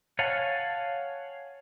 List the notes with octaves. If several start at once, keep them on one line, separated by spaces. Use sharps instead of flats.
C#5 F5 F#5 G#5 A5